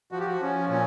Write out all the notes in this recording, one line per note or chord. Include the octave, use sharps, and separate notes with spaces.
F3 F#4
G4
F#4
F3 C#4
A#2 C#4